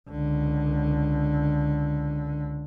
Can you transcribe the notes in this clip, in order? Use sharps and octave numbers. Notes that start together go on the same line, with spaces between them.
C#2 D3